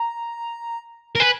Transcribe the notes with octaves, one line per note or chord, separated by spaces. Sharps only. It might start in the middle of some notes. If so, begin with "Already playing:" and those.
Already playing: A#5
A#4
B4 G#5